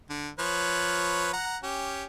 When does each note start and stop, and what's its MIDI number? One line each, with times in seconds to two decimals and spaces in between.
0.09 0.29 50
0.39 1.32 53
0.39 1.32 71
0.39 1.32 73
1.33 1.57 78
1.33 1.57 82
1.63 2.04 61
1.63 2.04 67